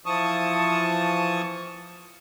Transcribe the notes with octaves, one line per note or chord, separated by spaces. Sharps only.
E3 F3 A5 C#6 D#6